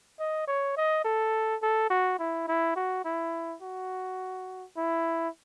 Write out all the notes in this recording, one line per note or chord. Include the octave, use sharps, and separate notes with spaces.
D#5
C#5
D#5
A4
A4
F#4
E4
E4
F#4
E4
F#4
E4